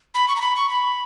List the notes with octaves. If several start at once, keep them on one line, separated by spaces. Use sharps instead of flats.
B5
C#6
A#5
B5
C#6
B5